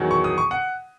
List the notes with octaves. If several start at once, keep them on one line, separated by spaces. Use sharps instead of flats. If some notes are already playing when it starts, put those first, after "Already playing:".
Already playing: E2 D#3 F#3
C#6
D#6
C#6
F#5